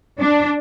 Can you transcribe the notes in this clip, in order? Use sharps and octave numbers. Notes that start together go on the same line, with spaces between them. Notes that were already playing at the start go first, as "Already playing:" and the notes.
D4